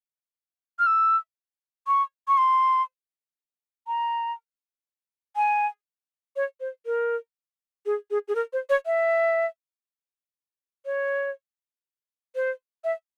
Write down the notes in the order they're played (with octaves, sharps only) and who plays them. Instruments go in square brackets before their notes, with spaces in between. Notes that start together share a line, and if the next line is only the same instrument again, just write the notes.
[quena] F6
E6
C#6
C#6
C6
A#5
G#5
C#5
C5
A#4
G#4
G#4
G#4
A#4
C5
C#5
E5
C#5
C5
E5